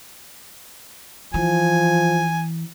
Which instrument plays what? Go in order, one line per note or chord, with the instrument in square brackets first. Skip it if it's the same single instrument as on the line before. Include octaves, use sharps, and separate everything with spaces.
[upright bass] E3 [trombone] F3 [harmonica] G#5